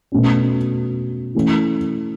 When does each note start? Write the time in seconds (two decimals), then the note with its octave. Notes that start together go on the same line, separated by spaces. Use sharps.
0.12 B2 A3 C#4
1.35 E3 A3 C#4